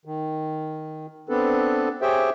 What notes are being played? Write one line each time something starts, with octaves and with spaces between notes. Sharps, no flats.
D#3
B3 C4 D4 A4 B4
G4 G#4 C5 C#5 E5 G5